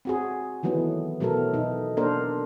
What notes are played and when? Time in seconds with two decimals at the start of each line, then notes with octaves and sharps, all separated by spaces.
0.05 C4 F#4 G#4
0.63 D#3 E3 F#3 A3 B3
1.20 B2 F#3 A3 B3 A4 A#4
1.54 B2 D#4
1.97 A#3 D4 A4 A#4 C5